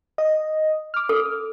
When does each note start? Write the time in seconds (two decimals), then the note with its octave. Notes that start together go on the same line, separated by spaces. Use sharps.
0.18 D#5
0.94 D6 F6
1.09 A4